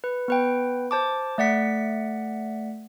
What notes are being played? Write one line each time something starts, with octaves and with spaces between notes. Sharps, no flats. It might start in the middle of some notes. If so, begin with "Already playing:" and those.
B4
B3 B4 G5
C5 A5 D6
A3 D5 F#5 B6